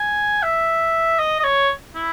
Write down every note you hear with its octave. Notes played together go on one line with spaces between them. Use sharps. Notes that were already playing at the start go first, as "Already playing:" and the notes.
Already playing: G#5
E5
D#5
D#5
C#5
E4